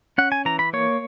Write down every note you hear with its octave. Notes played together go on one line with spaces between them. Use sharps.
C#4 F#5
G#5
E3 A#5
B5
A#3 C#5